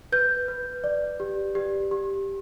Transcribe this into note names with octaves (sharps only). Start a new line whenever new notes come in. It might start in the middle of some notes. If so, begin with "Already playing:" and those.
B4 G6
B4
D5
G4
G4
G4